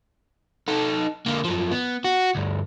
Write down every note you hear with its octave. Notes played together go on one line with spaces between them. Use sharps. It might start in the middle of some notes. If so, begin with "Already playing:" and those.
D#4 A4
D3 A#3
F#2 F3
B3
F#4
D2 G2